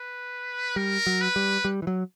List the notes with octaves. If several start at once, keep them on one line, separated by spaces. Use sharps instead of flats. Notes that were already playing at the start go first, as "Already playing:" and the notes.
Already playing: B4
G3 A#4
F#3
B4
G3
G3
E3
F#3